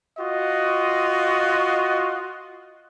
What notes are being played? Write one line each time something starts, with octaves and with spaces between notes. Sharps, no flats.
F4 F#4 D#5